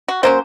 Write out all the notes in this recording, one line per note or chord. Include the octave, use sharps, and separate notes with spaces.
F#4
F#3 A#3 C#4 C5